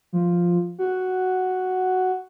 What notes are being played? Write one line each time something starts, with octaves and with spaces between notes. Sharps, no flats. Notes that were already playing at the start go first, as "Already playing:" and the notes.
F3
F#4